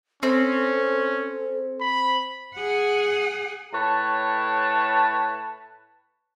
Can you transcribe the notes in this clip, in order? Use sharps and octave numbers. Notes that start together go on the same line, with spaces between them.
C4 C#4 A4
B5
G#4 F#5
A2 B4 C#5 A5